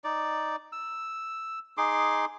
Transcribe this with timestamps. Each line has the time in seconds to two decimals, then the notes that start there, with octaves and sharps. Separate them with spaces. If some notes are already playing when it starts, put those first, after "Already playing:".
0.04 D#4 D5
0.72 E6
1.77 D#4 G#4 C6 D6